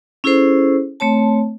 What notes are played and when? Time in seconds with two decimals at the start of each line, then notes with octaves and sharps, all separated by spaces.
0.24 C#4 E4 G#4 A4 C5
1.00 A3 C4 C#5 A5